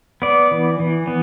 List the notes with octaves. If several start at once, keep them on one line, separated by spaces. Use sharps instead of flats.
B3 D5
E3
E3
B3